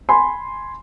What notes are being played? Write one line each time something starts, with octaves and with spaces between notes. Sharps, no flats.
G#5 B5 C6